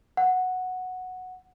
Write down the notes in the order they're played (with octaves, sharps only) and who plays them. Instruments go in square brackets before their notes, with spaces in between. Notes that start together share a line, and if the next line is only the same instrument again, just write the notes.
[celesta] F#5